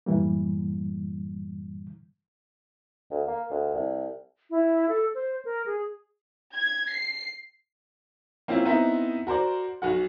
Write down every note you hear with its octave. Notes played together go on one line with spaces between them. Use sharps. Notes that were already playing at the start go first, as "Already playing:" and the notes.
F#2 A2 E3 G3 A#3
D2
A#3
D2
C2
E4
A4
C5
A#4
G#4
G#6
C7
A#3 C4 C#4 E4 F4
B3 C4 D#4 E4 A#4 E5
F#4 A#4 C5 D5
B1 F#4 F#5